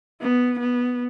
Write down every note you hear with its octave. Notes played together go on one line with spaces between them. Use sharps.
B3
B3